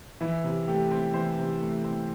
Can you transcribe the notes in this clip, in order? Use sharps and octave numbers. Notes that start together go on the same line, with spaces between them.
E3 E4
C3
A3 G4
C4
E3 C5
C3
A3
C4